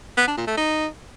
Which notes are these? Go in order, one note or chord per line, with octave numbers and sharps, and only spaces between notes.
B3
D4
A#2
A3
D#4